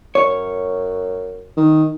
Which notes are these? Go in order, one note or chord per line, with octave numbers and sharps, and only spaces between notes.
F#2 C#5
D#3